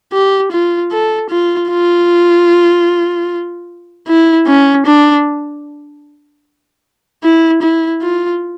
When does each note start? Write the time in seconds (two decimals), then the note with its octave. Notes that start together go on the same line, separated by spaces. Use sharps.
0.13 G4
0.52 F4
0.91 A4
1.30 F4
1.70 F4
4.07 E4
4.47 C#4
4.86 D4
7.23 E4
7.62 E4
8.02 F4